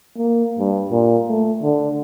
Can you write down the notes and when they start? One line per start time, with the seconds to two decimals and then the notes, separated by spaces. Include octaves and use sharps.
0.17 A#3
0.59 G2
0.91 A#2
1.29 A3
1.62 D3